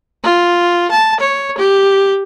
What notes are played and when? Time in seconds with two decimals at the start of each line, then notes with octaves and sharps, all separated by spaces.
0.24 F4
0.91 A5
1.20 C#5
1.58 G4